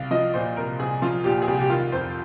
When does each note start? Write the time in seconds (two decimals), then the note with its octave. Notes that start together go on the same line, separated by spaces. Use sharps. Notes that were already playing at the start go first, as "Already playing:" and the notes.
Already playing: C2 F5
0.11 F3 D#5
0.34 A#2 C5
0.57 C2 A#4
0.80 C2 G#4
1.02 F3 F4
1.24 A#2 G4
1.42 G#4
1.47 C2 G4
1.61 G4
1.70 D#3 F4
1.92 F2 C5